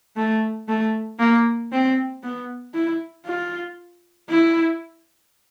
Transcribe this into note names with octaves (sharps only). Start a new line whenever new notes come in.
A3
A3
A#3
C4
B3
E4
F4
E4